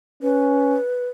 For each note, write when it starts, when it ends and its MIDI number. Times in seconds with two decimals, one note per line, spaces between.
0.23 0.79 61
0.23 1.09 71